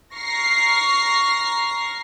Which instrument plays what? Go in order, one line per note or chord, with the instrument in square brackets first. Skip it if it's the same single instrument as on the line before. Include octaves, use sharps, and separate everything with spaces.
[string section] A#5 C#6 F6 A#6 C7